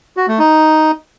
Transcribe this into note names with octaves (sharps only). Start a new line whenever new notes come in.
F#4
A3
D#4